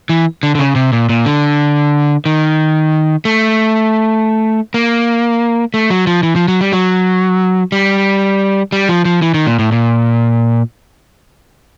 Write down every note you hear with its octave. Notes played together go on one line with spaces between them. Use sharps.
E3
D3
D3
C#3
C3
A#2
A#2
D3
D#3
A3
A#3
A3
F#3
F3
E3
F3
F#3
G3
F#3
G3
G3
F3
F3
E3
D#3
A#2
A2
A#2